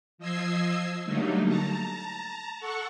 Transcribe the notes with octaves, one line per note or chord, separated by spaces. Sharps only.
F3 D#5 E6 G#6 C7
D3 F#3 G3 A3 A#3 D#4
A5 A#5
A4 F#5 C#6